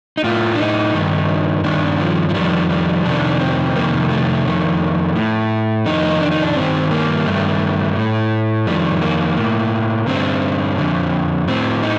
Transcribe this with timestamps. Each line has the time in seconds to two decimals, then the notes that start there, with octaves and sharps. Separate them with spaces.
0.17 D#4
0.24 A2 F4
0.55 D4
0.59 D#4
0.94 G2 D#3
1.64 G2 D#3 D4
1.99 F3
2.29 F3
2.34 F2 D#3 G3
2.69 G3
3.05 F2 C3 D#3 D4
3.40 C4
3.75 F2 C3 D#3 A#3
4.10 A3
4.46 F2 D#3
5.16 A2
5.86 F2 D#3 D#4
6.21 D4
6.31 D#4
6.43 D4
6.56 G2 D#3 C4
6.91 A#3
7.26 G2 D#3 A3
7.96 A2
8.67 F2 D#3 G3
9.02 A#3
9.37 A2
10.07 G2 D3 C4
10.77 F2 D3
11.48 A2 C4
11.83 D#4